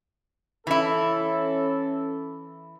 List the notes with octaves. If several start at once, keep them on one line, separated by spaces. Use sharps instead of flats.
E3 C#4 E4 A4